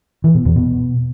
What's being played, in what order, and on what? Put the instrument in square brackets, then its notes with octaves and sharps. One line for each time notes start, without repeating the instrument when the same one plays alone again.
[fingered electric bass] E3
B2
E2
B2